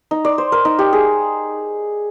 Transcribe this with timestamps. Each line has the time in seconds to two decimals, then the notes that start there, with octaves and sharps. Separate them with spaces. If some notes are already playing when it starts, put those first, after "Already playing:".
0.11 D#4
0.25 D5
0.38 C5
0.52 A#4
0.65 D#4
0.79 G4
0.93 G#4